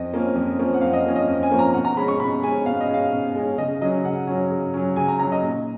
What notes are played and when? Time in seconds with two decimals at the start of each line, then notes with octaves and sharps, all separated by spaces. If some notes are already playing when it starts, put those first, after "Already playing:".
Already playing: F2 D#5
0.13 F3 A#3 C#4
0.35 F2
0.59 F3 A#3 C#4
0.74 F#5
0.81 F2 F5
0.93 D#5
1.05 F3 A#3 C#4
1.16 D#5
1.28 F2
1.43 G#5
1.51 F3 A#3 C#4
1.59 A#5
1.74 B2 F#5
1.85 A#5
1.97 G#3 C#4 B5
2.08 C#6
2.20 B2 B5
2.43 G#3 G#5
2.47 C#4
2.66 B2 F5
2.80 D#5
2.89 G#3 C#4 F5
3.12 B2
3.35 G#3 C#4
3.58 C#3 D#5
3.81 F#3 C#4 D#5
4.04 C#3 F#5
4.27 F#3 C#4
4.51 C#3
4.74 F#3 C#4
4.96 C#3 G#5
5.08 A#5
5.19 F#3 C#4 A#5
5.32 D#5
5.43 A#2